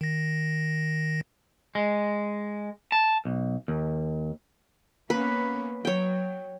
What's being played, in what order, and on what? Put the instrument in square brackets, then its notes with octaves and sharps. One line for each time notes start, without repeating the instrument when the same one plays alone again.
[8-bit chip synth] D#3 A#6
[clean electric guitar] G#3
A5
B1
D#2
[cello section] A#3 B3 C#4 [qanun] B4
[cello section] F#3 [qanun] C#5 G5